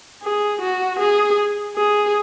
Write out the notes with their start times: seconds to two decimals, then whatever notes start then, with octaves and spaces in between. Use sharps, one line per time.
0.23 G#4
0.62 F#4
1.00 G#4
1.77 G#4